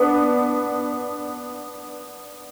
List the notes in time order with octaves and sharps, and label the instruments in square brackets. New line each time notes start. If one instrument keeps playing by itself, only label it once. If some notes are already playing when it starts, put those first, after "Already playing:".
Already playing: [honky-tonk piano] B3 D4